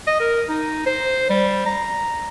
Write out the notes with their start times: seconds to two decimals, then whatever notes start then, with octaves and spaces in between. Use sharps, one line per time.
0.07 D#5
0.20 A#4
0.49 D#4
0.86 C5
1.30 G3
1.66 A#5